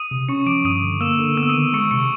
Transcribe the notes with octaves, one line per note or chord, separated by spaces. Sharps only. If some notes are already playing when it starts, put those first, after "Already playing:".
Already playing: D#6 D#7
C3
C#4 C#6 C#7
F3 D6 D7
G2 D#6 D#7
D3
A#3 E6 E7
D3
B3 E6 E7
D#6 D#7
D#3
G#3 C#6 C#7
C3 C#6 C#7